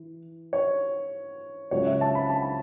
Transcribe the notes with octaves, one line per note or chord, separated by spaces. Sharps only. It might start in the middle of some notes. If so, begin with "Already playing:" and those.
Already playing: E3
C#5
C#2 C#3 F#3 C#5
E5
A5
B5
A5
B5